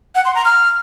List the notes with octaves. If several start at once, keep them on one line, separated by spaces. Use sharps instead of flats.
F#5
C6
A#5
F6